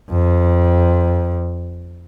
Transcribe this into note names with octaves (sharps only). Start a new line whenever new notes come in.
F2